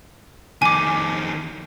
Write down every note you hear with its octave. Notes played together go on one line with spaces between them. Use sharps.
F2 D#3 G#5 D6